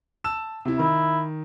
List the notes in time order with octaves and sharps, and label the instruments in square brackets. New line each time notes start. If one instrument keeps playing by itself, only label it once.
[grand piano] A5 E6 E7
C3 E4
[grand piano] D#3 [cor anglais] E4